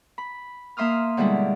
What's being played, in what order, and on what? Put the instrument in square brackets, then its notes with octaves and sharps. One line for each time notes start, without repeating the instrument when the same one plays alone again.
[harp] B5
A#3 E5 C6 D#6 F6
B2 D3 G3 G#3 E4 G#4